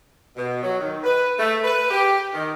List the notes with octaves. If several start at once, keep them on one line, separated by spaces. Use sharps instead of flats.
B2
F#3
D#3
B4
A3
B4
G4
D#3